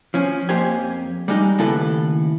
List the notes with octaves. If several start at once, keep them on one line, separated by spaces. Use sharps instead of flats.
F3 C#4
F2 A#3 G4 C5 G#5
G3 G#3 D#4
D#2 A2 C#3 E4 A4 B4